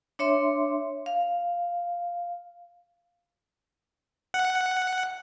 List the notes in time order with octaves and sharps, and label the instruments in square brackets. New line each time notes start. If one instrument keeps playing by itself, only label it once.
[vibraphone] D4 C#5 E5 C6
F5
[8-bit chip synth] F#5